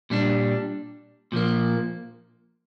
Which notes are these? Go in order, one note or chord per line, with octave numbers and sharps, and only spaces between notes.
A#2 G3 D4
A#2 F3 A#3